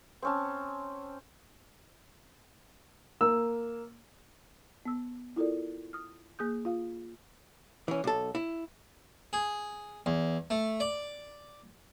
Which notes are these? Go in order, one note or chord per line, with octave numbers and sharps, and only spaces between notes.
C4 C#4 A5
A#3 E6
B3 E6
E4 F4 A4 A#4 D5
D#6 F6
A#3 G#4 D#6 G6
F4 F5
E3 C#4
B1 A4
E4
G#4
E2
A3
D5